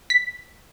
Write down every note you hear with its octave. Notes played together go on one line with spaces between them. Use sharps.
B6